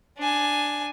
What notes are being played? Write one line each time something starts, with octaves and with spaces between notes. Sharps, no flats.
D4 G#5